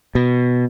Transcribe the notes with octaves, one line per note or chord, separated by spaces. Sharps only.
B2